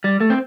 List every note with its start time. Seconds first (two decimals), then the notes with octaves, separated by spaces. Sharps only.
0.04 G3
0.20 A3
0.30 C4